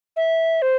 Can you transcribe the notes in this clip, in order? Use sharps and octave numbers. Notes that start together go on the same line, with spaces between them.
E5
C5